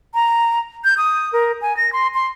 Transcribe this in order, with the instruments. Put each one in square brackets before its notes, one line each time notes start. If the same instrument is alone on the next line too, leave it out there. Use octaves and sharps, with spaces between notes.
[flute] A#5
G6
D#6
A#4
G#5
A#6
C6
C6